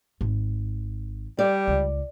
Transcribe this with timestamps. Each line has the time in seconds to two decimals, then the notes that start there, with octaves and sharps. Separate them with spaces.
0.21 G#1
1.39 G3 D5
1.68 C#2